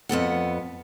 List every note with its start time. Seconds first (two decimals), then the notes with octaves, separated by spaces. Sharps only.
0.09 F2 B3 A4 F#5